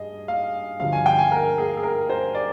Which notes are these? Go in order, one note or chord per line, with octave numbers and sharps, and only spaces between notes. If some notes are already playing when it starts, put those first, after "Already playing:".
Already playing: G2 G#4 D#5
F5
G2 D3 F3 F5
G#5
G5
G#5
A#4
G#4
G#4
A#4
C5
D5